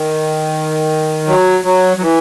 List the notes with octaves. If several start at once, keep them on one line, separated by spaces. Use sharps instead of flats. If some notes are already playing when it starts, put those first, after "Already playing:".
Already playing: D#3
F#3
F#3
F#3
E3